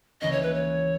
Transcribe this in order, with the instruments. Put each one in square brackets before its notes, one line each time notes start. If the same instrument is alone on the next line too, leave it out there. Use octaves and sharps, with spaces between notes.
[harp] C#2 C#3 E3 A#3 C#4 [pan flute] D#5
[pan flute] C#5
B4
C#5